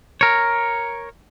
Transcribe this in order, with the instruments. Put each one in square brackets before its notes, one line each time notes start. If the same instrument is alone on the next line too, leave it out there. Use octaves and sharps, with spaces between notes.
[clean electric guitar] A#4 C#5